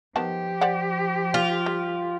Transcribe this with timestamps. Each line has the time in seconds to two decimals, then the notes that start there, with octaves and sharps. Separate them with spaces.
0.16 D#3 F3 B3 G4 A5
0.61 C5 D5 F#5
1.34 F4
1.66 G3